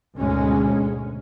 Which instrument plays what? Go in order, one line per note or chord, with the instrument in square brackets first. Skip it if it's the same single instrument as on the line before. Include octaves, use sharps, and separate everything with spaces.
[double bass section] D2 G#2 B2 G#3 C#4